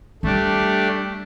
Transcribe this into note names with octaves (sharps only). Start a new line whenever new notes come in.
G3 A3 D4 G4